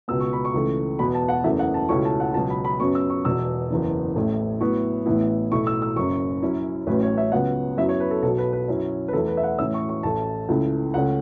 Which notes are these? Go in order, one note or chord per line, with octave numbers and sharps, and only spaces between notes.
C#2 B2 B3 E6
C#6
B5
C#6
C#2 C#3 E3 A3
E2 B2 B3 B5
A5
F#5
F#1 E2 C#3 A3 E4 E5
F#5
A5
C#2 B2 A3 C#4 E4 C#6
A5
F#5
C#2 B2 F#3 A5
B5
B5
F#2 C#3 F#3 B3 C#6
E6
C#6
E1 E2 B2 E6
F#1 E2 C#3 E3
A1 A2 A3 E4
A2 F#3 B3 E4 C#6
A1 A2 E3 B3 E4
B1 A2 A3 E4 C#6
E6
E6
F#1 F#2 C#3 C#6
F#2 F#3 C#4 E4
A1 A2 F#3 C#4 B4
C#5
E5
C#2 C#3 F#3 B3 F#5
F#2 F#3 B3 E4 E5
C#5
B4
A4
B1 B2 F#3 A4
B4
B4
F#2 F#3 C#4 E4
B4
E2 E3 A3 E4 A4
B4
E5
F#5
A2 E3 C#4 E6
C#6
C#6
A1 A2 A3 A5
C#2 C#3 A3 E4
C#2 C#3 A3 C#4 F#5